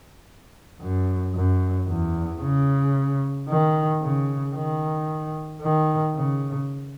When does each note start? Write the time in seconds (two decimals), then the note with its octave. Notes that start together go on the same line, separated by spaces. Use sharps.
0.81 F#2
1.35 F#2
1.88 E2
2.41 C#3
3.48 D#3
4.02 C#3
4.55 D#3
5.62 D#3
6.15 C#3